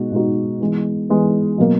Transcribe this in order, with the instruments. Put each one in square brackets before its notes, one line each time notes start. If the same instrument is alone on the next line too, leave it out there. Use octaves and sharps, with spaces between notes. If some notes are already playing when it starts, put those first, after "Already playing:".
Already playing: [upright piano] B2 G#3 D#4 F#4
B2 G#3 D#4 F#4
E3 G#3 B3
E3 G#3 B3
B2 F#3 A#3